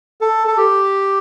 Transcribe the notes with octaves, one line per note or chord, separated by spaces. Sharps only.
A4
A4
G4